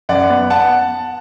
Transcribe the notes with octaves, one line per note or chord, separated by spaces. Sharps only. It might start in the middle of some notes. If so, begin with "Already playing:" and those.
F#2 D5 F#5
B3
F#5 A5